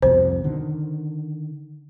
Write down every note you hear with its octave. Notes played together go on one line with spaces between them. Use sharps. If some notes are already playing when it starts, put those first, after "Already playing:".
C2 F2 B2 C5
D3 D#3